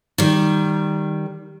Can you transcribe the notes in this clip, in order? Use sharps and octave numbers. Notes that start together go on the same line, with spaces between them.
D#3 G3